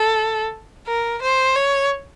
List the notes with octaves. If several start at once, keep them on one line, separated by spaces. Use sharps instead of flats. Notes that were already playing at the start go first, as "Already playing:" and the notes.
Already playing: A4
A#4
C5
C#5